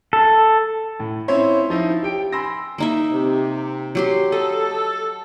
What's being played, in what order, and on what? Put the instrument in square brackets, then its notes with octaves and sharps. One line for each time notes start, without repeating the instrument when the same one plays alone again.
[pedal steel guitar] A4
[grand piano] A2
C4 C#4 E4 F4 C5 C#5
F3 D#4 E4
G4 G5 D7
G#5 B5 C6 E6 A#6
[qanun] A#3 D#4 E5
[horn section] C3
[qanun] F#3 G4 C6
[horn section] A4 [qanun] D#5